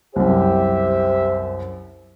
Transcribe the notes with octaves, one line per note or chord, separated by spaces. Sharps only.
C2 F#2 G4 C5 E5